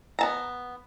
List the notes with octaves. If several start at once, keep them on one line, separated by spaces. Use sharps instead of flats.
B3 A5 A#5